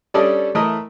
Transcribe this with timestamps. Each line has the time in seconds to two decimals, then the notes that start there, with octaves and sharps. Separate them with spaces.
0.14 G3 C#4 D4 A4 D5 D#5
0.55 E3 A3 E4 A#4 D#5